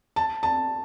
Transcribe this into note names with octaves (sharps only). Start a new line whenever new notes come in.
A5
A5